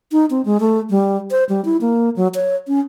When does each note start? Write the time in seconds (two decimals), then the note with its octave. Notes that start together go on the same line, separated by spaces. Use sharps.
0.12 D#4
0.30 C4
0.45 G#3
0.60 A3
0.90 G3
1.31 C5
1.49 G3
1.65 E4
1.81 A#3
2.16 F#3
2.34 C#5
2.68 C#4